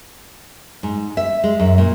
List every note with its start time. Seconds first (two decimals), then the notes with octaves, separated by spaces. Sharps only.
0.83 G#2
1.17 E5
1.44 G#3
1.60 F#2
1.78 A#2